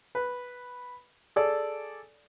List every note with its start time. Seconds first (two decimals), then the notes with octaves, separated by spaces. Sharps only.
0.15 B4
1.36 G#4 A4 D5